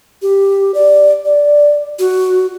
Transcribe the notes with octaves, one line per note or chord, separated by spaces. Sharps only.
G4
D5
D5
F#4